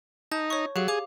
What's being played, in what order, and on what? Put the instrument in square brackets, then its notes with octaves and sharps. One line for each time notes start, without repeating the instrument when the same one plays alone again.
[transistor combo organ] D#4 [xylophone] A5 G6
[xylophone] C#5 C#6
[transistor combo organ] F#3 [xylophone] G4 G#4 F5
[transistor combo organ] G#4 [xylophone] F5 D6 F7